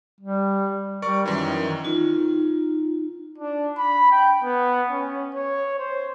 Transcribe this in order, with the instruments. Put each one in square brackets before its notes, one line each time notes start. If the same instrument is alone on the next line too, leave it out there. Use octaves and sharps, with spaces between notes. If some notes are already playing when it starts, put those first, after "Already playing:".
[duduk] G3
[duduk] G3 [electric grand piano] A#4 D5 C#6
[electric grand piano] F#2 E3 [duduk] D#3
[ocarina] D#4 [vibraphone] F4
[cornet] D4
B5
G5
B3
C#4
C#5
C5